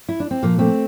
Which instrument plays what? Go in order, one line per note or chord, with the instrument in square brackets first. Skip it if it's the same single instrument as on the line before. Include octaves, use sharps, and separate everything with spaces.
[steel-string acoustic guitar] E4
D4
C4
A#2 F3 A#3
A3 C4